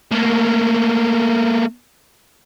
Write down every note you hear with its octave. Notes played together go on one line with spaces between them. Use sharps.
A3 A#3